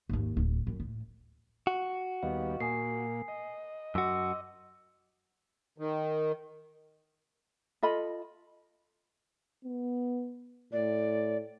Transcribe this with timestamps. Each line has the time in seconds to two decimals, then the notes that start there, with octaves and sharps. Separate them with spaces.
0.09 G#1 D#2
0.37 D1
0.67 F#2
0.80 A2
1.67 F#4
2.23 D#2 G3 B3 D#5 F5
2.60 A#2 A#3 G#5 D#6 C7
3.28 D#5
3.95 F#2 F#4 C6 D6 E6
5.78 D#3
7.83 F4 A4 D#5 B5
9.65 B3
10.73 A2 D5